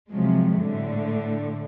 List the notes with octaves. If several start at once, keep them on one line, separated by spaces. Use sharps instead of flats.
C3 F3 F#3 G#3
A2 D3